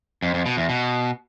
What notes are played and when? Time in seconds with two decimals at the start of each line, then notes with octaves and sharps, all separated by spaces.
0.22 F2
0.34 F2
0.46 B2
0.57 E2
0.69 B2